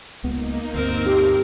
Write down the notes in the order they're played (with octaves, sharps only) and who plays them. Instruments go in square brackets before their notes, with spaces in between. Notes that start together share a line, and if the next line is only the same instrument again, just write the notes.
[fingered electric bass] C#2 B3 [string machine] A#3 D#4
[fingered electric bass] D2 G2 [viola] C4 A#4
[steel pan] G4